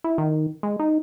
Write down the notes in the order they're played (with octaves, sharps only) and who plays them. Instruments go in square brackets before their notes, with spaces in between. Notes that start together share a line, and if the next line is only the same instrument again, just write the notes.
[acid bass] E4
D#3
G#3
D#4